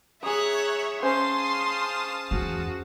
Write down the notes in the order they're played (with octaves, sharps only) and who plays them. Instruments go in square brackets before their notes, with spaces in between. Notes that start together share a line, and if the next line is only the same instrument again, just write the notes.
[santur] G#4 D#6 [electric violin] C#5 E5 [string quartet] A#5 F#6
[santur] C#4 C5 G#5 [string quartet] F5 A5 D#6 [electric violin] C6
[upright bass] E2 [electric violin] F#4